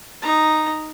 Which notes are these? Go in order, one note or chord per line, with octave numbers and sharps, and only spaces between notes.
D#4 A#5